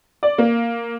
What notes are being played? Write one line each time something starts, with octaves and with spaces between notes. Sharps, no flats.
D5
A#3